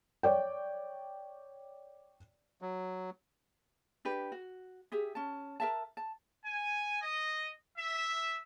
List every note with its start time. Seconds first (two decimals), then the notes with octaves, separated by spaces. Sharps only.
0.23 C#5 D5 G5
2.62 F#3
4.05 D4 G4 B4
4.32 F#4
4.92 G4 G#4 E5
5.15 C#4 A5
5.60 A#4 E5 A5
5.97 A5
6.44 G#5
7.01 D#5
7.76 E5